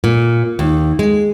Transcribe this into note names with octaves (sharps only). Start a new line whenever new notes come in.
A#2
D#2
G#3